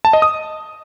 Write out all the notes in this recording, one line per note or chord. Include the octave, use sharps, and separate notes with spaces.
A5
D#5
D#6